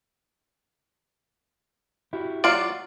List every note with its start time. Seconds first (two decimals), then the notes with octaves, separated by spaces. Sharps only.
2.13 E4 F#4 G4
2.44 F#3 F4 D5